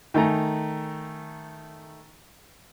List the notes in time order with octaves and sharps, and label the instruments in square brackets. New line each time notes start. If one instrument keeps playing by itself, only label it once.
[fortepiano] D#3 A3 G#5 A#5